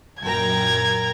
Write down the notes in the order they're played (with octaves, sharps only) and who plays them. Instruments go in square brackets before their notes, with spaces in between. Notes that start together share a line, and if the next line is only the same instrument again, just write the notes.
[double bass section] F#2 A#2 [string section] A#4 G5 A#5 [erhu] G#6